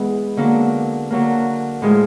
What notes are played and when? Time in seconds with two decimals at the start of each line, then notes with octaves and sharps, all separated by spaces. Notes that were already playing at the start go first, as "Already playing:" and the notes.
Already playing: E3 G#3 B3
0.37 D3 F#3 A#3
1.10 D3 F#3 A#3
1.82 A2 F3 G#3